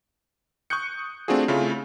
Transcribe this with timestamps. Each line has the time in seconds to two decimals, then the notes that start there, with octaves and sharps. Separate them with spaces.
0.70 C#6 D#6 F#6 G6 C#7
1.28 A3 C4 D4 F4 F#4 G#4
1.48 C#3 A3 C4 E4 F4